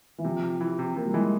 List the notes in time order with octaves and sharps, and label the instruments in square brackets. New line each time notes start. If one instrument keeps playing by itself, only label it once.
[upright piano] E3
[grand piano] C3 [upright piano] F3
[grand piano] C3
E3
C3
[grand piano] C3 [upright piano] A#3
[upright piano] G3
[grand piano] E3 [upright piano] G#3